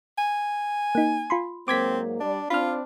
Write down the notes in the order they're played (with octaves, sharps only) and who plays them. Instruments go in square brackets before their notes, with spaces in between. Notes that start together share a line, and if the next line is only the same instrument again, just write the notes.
[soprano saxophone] G#5
[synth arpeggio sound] A#3 D#4
F4 B5 C6
[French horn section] G#2 F#3 A#3 [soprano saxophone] C4 [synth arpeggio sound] D6 G#6 B6
[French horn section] G3 G4 D5 [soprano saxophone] D4
[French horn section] C4 D4 [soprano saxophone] F4 [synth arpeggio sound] B5 F6